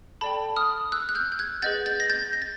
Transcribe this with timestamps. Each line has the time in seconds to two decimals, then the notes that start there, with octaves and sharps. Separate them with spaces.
0.21 A4 D5 G5 A5 B5
0.56 D#6 F6
0.92 E6 F#6
1.09 F#6
1.15 F6 G6
1.32 G6
1.39 F#6 G#6
1.62 G#4 B4 D#5 F#5 G6 A6
1.86 G6 A6
2.00 A#6
2.10 G6 A6
2.33 A#6
2.42 A6